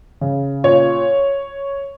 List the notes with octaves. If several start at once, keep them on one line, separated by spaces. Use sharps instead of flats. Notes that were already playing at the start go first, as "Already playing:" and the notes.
C#3
A#2 C#5